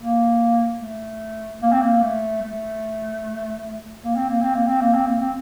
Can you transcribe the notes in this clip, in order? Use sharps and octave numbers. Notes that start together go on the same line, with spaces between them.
A#3
A3
A#3
C4
A#3
A3
A3
A#3
C4
A#3
C4
A#3
C4
A#3
C4
A#3
C4